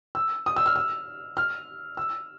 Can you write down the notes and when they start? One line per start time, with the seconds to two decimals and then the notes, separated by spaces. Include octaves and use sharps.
0.15 E6
0.46 D#6
0.56 E6
0.66 F6
0.76 E6
1.37 F6
1.97 E6